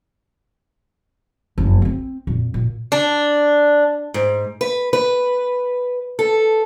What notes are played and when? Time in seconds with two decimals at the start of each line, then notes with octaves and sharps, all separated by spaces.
1.58 F#1 F2
1.82 A#3 C4
2.27 F2 A#2
2.54 A#2
2.92 D4
4.14 G#2
4.61 B4
4.93 B4
6.19 A4